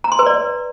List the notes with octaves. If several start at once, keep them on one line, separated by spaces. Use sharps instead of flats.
A#5
C6
B4
D5